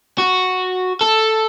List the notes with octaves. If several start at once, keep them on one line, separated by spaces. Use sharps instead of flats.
F#4
A4